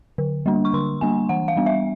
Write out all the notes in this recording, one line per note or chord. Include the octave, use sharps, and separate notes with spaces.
D3
G3 A#3 D4
C#6
D3 C6
G3 A#3 D4 G#5
E3 F#5
F5
G3 B3 D4
E5